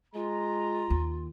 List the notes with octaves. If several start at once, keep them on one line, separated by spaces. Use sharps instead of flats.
G#3 F4 A#5
D#2